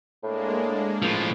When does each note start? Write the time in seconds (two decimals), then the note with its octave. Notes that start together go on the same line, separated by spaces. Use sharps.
0.23 A2 G#3 A#3 D4
1.02 A2 F3